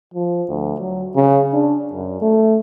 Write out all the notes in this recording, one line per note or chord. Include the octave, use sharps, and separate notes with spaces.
F3
D2
F#3
C#3
D4
F#2
A3